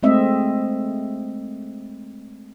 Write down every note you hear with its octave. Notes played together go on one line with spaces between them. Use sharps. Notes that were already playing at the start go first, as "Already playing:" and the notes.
G#3 A3 C4 D#5 E5